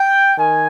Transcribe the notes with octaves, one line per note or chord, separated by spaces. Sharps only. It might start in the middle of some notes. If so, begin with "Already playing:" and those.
Already playing: G5
D#3 G#5